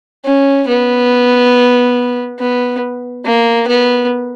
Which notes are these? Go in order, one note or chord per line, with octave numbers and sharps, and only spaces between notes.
C#4
B3
B3
A#3
B3